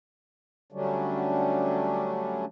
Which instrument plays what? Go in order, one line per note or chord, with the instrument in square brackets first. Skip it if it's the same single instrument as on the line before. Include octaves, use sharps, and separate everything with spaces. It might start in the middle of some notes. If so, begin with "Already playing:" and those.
[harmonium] D3 F#3 G3 A3 C#4 D4